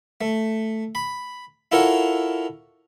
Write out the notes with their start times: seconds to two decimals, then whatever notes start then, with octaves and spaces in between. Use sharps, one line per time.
0.21 A3
0.95 B5
1.72 E4 F4 A4 A#4 C#5 F#5